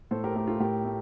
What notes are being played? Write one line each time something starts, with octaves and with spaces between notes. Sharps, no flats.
A2 A4 C5
G4 A#4
A3 G4 A#4
F4 A4
A2 G4 A#4
A3